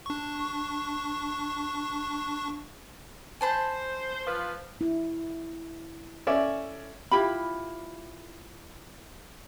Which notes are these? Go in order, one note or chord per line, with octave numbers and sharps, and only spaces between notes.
D4 C#6
C5 G#5 A5 B5
F3 F4 B4
E4
C#4 A4 D5 E5
E4 F4 G4 B5